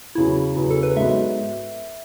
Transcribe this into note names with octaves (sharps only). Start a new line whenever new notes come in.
E2 C#3 F#3 E4
E2 C#3 F#3
A4
B4
G#2 F#3 B3 E5